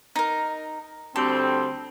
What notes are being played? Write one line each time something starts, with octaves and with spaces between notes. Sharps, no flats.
D#4 A#4
D2 G3 C4 A4